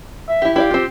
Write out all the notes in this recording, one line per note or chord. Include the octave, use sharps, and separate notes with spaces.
E5
E4 G4
E4 G4 D5 F5
C4 F4